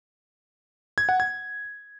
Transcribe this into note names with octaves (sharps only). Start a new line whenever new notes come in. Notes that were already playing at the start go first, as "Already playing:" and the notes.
G#6
F#5
G#6